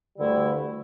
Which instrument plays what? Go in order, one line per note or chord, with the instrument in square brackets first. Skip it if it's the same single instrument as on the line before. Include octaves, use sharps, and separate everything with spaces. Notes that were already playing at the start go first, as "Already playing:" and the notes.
[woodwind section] D2 D3 A3 E4 [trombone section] G2 G3